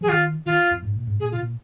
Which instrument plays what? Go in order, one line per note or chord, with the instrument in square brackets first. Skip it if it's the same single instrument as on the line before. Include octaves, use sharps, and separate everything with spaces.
[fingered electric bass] F3 [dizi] G#4
[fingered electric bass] D#3 [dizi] F4
[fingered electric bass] D#3 [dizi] F4
[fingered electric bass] F2
G#2
A#2
G#2
[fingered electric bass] A#2 [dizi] G#4
[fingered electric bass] C#3 [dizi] F4
[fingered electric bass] A#2